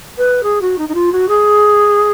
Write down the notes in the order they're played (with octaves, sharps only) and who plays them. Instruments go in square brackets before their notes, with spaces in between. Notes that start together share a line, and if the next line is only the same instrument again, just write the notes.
[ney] B4
G#4
F#4
D#4
D#4
F4
F#4
G#4